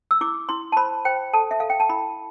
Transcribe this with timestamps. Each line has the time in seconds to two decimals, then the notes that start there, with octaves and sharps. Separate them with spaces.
0.11 E6
0.21 E4 D6
0.49 E4 C6
0.72 A5
0.77 C5 B5
1.05 C5 G5
1.33 A4 A5
1.51 E5
1.60 A4 F5
1.70 G5
1.80 A5
1.89 E4 B5